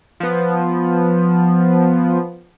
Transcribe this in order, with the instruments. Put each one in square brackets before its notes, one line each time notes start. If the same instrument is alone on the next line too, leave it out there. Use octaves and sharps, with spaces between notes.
[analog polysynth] F3 B3